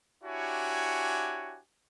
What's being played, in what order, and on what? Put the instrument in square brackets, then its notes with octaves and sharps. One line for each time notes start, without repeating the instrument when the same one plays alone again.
[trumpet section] D4 E4 F#4 G4 C#5 G#5